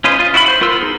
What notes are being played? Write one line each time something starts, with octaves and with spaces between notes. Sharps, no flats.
C#4 F4 B4 C5 D#5
F4
E4 F#4 D#5 B5
C5
B3 F4 A#4 C6 E6
D#4 G#4